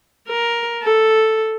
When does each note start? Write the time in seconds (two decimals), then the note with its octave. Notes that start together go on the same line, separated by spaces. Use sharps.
0.28 A#4
0.83 A4